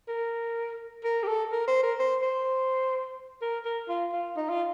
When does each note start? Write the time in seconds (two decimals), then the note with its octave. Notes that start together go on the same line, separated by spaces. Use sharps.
0.08 A#4
1.04 A#4
1.23 G4
1.27 A4
1.52 A#4
1.68 C5
1.83 A#4
1.99 C5
2.22 C5
3.42 A#4
3.65 A#4
3.89 F4
4.13 F4
4.36 D#4
4.50 F4